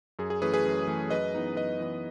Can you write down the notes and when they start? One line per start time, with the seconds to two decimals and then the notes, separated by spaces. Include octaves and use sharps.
0.19 F#2 G#4
0.30 G#4
0.42 E3 A3 C#4 G#4 B4
0.53 G#4 B4
0.66 F#2
0.87 E3 A3 C#4
1.10 F#2 B4 D#5
1.35 E3 B3 D#4
1.57 F#2 B4 D#5
1.80 E3 B3 D#4